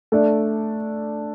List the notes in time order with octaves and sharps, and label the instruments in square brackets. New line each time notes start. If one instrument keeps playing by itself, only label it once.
[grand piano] A3 D4 A4 D5